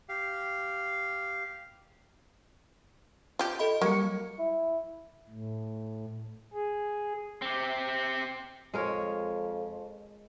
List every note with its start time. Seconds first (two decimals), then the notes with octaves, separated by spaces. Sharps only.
0.09 G4 F5
3.39 F4 G4
3.59 A4 D#5 B5
3.81 F#3 G3 A#3 C#6 C#7
4.38 E4
5.29 A2
6.53 G#4
7.42 C4 G4
8.74 F2 G#3 A#4 C#5